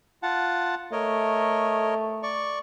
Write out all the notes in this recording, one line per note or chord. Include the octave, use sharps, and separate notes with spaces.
F4 F#5 A5
A3 A#4 C#5 D#5
D5 C#6